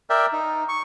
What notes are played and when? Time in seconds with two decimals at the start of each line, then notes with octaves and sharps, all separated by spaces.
0.10 A#4 D5 E5 G5
0.33 D#4
0.69 C#6